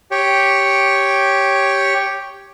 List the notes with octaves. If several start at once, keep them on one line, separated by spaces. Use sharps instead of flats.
G4 C#5